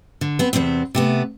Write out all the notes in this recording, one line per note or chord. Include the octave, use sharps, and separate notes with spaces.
D3
B3 C4
E2 G#2 C3 B3 C4
C3 A3 B3